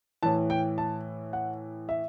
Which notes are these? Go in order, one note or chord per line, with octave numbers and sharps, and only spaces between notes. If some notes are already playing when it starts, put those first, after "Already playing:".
A2 E3 A5
G5
A5
F#5
E5